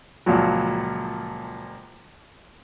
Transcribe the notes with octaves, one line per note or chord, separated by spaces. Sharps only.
C#2 A#2 F3 F#3